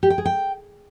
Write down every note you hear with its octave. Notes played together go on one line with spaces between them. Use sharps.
G4
G5
G#4
G5